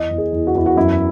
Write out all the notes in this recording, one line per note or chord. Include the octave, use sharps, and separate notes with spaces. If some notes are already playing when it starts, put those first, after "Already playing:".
Already playing: E2 D#5
E2
G#4
E2
F#4
E2 E4
F#4
F#2 E4